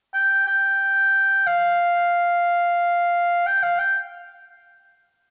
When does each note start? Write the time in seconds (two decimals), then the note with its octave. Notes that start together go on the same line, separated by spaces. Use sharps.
0.14 G5
0.47 G5
1.47 F5
3.47 G5
3.63 F5
3.79 G5